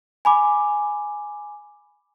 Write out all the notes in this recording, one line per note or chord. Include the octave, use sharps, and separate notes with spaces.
G#5 B5 D6